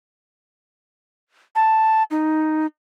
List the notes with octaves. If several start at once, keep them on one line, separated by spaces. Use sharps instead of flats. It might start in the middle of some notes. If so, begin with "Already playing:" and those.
A5
D#4